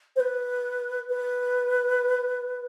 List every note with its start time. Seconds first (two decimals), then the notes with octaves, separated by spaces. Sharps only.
0.16 C5
0.20 B4
1.09 B4